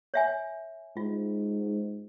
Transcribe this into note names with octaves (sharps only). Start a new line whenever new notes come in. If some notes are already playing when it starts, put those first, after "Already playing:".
C#5 E5 G#5
G#2 F4